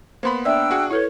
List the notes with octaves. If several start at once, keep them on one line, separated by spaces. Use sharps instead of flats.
A#3 B3 C5 B5 C6
D4 D5 E5 G5 E6
F#4 G#4 F#5
E4 A4 B4 C#5